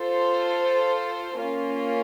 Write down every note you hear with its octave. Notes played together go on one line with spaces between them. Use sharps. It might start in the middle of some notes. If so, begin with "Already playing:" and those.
Already playing: F4 A4 C5
A#3 C#4 F4